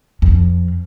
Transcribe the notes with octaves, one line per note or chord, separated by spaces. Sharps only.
F2